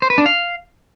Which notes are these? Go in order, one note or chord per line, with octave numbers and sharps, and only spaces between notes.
C5
B4
D4
F5